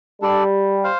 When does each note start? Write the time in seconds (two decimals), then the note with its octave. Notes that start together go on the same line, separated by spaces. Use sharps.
0.22 G3 D4 A4 D5
0.84 C5 F5